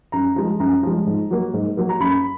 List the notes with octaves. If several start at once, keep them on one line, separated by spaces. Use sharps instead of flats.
F#2 A#5
F3 G#3
F#2 A#5
F3 G#3
G#2
F#3 A#3
G#2
F#3 A#3
A#5
F#2 B5